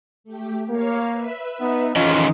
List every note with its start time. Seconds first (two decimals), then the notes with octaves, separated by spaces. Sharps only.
0.24 A3 G4
0.69 A#3 C#5 F5
1.10 B4 E5
1.60 B3 D#4
1.96 F2 D#3 E3 C#4 D#4 F4 G#4 D#5